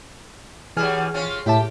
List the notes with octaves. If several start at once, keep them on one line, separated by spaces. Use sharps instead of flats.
E3 F#3 G3 G#4 G#5 F6
C4 C#4 F4
A2 G4 E5 A5